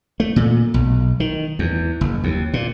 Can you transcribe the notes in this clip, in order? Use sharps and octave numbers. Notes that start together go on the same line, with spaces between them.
A3
A#2
B1
D#3
E2
F#1
D#2
A#2